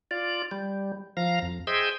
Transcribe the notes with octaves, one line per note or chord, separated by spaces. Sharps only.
F4 D5
G3
F3 F5 A#5
F2
G#4 C5 D#5 E5 G5